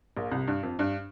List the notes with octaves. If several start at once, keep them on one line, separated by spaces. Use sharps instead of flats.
A#1 A#2
C2 C3
G2
F2
G2